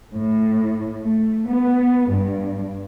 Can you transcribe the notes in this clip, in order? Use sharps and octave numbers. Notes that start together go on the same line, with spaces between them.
A2
A3
B3
G2